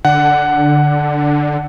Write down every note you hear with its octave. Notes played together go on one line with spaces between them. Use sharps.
D3 F#5